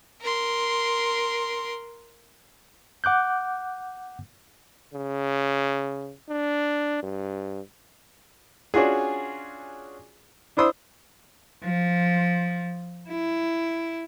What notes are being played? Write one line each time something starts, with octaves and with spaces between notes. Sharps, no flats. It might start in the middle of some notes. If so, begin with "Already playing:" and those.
A#4 C6
F#5 D6 F#6 G6
C#3
D4
G2
C#4 D4 F4 F#4 G#4
D4 E4 C5 D#6 E6
F3
E4